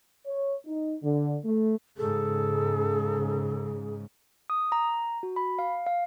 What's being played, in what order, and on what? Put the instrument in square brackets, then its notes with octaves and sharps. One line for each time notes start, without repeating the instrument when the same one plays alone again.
[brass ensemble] C#5
D#4
D3
A3
[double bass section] G#2 C#3 [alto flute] G#4 [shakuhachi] A4
[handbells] D#6
A#5
F#4
B5
F5
F5